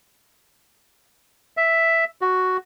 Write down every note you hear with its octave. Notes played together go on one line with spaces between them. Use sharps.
E5
F#4